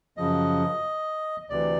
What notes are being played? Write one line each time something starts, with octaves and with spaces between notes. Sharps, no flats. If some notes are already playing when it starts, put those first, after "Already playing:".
F#2 C#3 F3 D#5
D2 C3 E3 D5